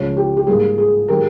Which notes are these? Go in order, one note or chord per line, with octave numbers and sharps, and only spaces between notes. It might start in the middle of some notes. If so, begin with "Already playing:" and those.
Already playing: C#2 C#3 F3 C#5
G4
G4
G#2 G3 A#3 G#4
G#4
D#3 G#3 G4 A#4